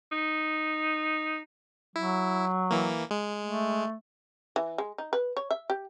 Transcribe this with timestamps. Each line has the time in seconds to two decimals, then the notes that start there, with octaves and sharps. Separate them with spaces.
0.12 D#4
1.96 F#3 E4
2.70 E3 A#3
3.11 G#3
3.43 A3
4.56 E3
4.78 G#3
4.98 D#4
5.13 B4
5.37 C#5
5.51 E5
5.70 G4